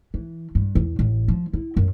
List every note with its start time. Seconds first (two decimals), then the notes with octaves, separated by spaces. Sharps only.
0.14 E3
0.55 G2
0.75 E2
0.99 A1
1.28 F3
1.53 E4
1.77 F#2